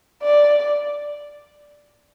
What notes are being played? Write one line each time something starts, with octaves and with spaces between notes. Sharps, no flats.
D5